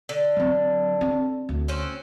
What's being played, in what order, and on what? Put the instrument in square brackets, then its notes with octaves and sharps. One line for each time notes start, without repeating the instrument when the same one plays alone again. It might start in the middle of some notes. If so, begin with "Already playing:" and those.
[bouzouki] D3
[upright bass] F#3 C4
C4
D2
[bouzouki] C4 C#4 F#4